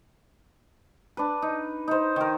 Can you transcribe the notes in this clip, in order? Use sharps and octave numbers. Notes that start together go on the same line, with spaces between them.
D4 B4
D#4
D#4 C5
D#3 A#4